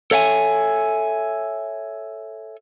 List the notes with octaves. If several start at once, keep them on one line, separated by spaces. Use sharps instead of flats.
A4 C#5 E5 F#5 G#5